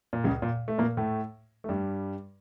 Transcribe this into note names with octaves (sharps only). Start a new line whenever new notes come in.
A#2
C#2 C#3
A#2
A3
A#2 A#3
A2 A3
A3
G2 G3